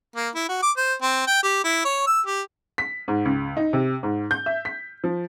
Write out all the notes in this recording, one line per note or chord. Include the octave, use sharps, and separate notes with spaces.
A#3
E4
F#4
D6
C5
C4
G5
G4
E4
C#5
E6
G4
B6
G#2
C#2
D#4
C3
G#2
G6
E5
B6
F3